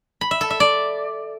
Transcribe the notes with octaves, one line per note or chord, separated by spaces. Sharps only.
B5
E5
A4
E5
D5